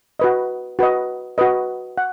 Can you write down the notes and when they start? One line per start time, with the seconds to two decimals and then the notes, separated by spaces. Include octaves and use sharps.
0.19 F#4 B4 D#5
0.79 F#4 B4 D#5
1.38 F#4 B4 D#5
1.98 F#5